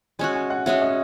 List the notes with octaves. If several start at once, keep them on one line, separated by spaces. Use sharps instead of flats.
G#3 C#4 F#4 G#5
G#5
F#5
G#3 C#4 F#4 E5
D#5